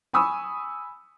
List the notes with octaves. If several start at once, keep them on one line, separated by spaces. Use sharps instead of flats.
G#5 B5 C#6 D#6 E6